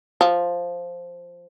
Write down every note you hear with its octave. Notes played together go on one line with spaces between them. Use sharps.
F3